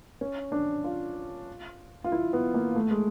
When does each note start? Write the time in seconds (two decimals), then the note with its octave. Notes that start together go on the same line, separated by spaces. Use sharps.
0.21 C#4
0.52 D4
0.84 F4
2.04 F4
2.12 E4
2.33 B3
2.54 A#3
2.76 A3
2.91 G#3